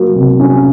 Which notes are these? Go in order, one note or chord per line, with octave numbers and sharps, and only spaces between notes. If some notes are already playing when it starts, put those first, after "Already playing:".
Already playing: F#3 A#3
C3
C#4